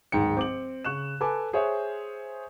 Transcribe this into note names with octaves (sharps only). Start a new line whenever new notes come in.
D1 G#2 D#3 G5 C#7
C4 D6 F#7
C#3 C#6 F#6 E7
A4 B4 G#5 D6
G#4 C5 C#5 E5